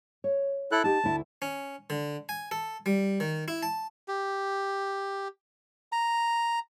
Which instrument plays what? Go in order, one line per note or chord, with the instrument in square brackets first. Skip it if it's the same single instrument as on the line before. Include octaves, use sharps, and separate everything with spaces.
[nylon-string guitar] C#5
[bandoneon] E4 A4 F#6
[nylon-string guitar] D#4 G4 [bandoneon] A5
[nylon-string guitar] D2 E4
[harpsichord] C#4
D3
G#5
A4
G3
D#3
E4
A5
[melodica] G4
A#5